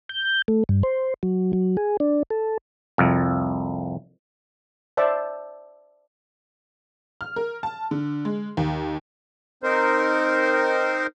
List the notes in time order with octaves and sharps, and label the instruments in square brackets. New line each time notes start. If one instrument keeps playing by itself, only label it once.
[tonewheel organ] G6
A3
G2
C5
F#3
F#3
G#4
D4
A4
[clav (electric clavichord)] C2 F2
[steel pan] C5 D5 E5 A5
[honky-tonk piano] F6
A#4
A5
D3
G#3
D#2
[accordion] C4 D#4 A#4 C5